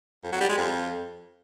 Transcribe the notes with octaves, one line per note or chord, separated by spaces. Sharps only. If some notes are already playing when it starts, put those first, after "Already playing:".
F2
F#3
G3
G#3
F2